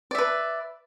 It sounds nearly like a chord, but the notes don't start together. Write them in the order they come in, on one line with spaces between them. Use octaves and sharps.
D5 E5 B4